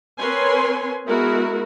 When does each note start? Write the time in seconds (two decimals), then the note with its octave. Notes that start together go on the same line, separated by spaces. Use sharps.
0.18 C4 A#4 B4 C#5 G#5 C6
1.06 G#3 B3 E4 F#4 A#4